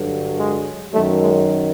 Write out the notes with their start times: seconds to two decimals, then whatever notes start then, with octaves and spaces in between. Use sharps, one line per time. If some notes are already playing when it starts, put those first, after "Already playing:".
Already playing: G2 D3 F#3
0.36 G#3
0.93 F#2 D#3 F#3 A3
1.21 G#3